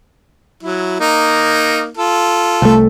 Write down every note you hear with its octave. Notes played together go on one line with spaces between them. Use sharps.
F#3 E4
A#3 D#4
F4 A4
C2 A3